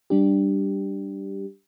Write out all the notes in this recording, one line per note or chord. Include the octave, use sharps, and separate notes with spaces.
G3 D4 G4